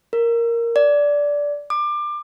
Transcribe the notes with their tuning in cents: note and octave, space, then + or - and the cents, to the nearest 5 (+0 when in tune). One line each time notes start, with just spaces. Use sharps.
A#4 +0
D5 -15
D6 +25